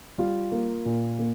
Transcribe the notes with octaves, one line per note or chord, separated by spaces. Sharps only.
G3 F4 F5
A#3
A#2
A#3